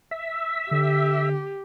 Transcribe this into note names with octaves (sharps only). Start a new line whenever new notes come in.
E5
D3 G4